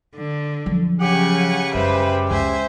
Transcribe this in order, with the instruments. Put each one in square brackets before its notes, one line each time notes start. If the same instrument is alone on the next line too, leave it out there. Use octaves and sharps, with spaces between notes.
[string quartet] D3
[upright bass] F2 F#3 [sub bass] F3
[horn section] C#3 G4 [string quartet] F#5 G#5 C#6
[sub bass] F#2 [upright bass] G3 [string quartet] B4 C5 E5
[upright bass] C#2 [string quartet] C5 E5 G#5